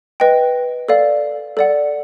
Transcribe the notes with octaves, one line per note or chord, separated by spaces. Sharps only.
B4 D#5 G5
A4 D5 F5
A4 D5 F#5